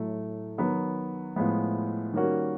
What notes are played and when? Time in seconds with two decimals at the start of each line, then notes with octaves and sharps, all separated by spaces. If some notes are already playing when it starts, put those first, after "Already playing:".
Already playing: A2 F#3 A3
0.58 D#3 F#3 B3
1.36 A2 F3 G#3 B3
2.13 D#3 G3 A#3 C#4 F#4